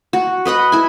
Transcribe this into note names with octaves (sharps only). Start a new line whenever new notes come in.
F#4
B4 D#5 F#5 B5
E4 G#5